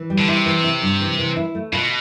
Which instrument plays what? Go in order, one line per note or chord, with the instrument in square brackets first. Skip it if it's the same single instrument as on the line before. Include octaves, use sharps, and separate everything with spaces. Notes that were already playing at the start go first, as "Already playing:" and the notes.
Already playing: [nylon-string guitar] E3
G3
[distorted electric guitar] D3
[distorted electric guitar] C3 [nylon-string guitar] E4
[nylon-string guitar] E3
E4
G2
E3
E3
E4
A3
[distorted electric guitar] B2 [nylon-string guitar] F4